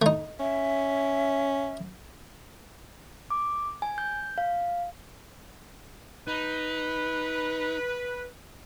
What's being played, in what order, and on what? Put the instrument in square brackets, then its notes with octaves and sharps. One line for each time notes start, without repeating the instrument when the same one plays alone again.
[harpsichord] A3 D#4
[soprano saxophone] C#4 [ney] E5
[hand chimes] D6
G#5
G6
F5
[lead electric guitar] D#4 [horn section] B4